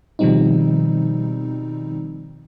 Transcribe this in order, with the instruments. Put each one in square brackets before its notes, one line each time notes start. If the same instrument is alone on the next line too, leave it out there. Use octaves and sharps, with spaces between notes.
[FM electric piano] B2 D#3 F3 G3 C4 D#4